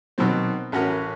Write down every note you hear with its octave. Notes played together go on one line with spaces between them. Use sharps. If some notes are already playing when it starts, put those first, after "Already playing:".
B2 D#3 F#3 C4
A1 C#4 F#4 A#4